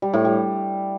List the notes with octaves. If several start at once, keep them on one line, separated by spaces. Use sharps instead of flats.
G3
A2
G3